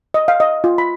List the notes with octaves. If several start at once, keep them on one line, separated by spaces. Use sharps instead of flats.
D#5
F5
D#5
F4
B5